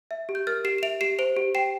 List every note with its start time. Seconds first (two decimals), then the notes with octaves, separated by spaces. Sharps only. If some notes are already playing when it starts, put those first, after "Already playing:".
0.11 E5
0.29 G4
0.35 G6
0.47 A#4 F6 A6
0.64 G4 C7 E7
0.78 E7
0.83 E5 D7 F7
1.01 G4 C7 E7
1.19 C5 D7 F7
1.37 G4
1.55 G5 C7 E7